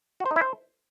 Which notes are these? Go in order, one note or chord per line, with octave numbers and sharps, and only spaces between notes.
F#4
C5
D#4
E4
C5